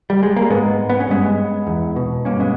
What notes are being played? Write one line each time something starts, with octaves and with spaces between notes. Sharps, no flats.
G3
G#3
A#3
G#2 G#3 B3
B3
C#4
G2 G#3 B3
E2
B2
G2 A#3 C#4
G#3 B3